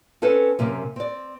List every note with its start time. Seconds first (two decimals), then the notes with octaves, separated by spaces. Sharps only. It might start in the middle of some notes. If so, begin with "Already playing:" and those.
0.22 C4 C#4 A4 B4 C5
0.59 F#2 C3 A#3
0.96 C4 D5